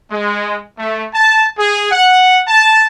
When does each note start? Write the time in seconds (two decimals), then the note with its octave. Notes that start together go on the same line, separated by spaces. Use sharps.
0.12 G#3
0.78 A3
1.14 A5
1.58 G#4
1.92 F#5
2.48 A5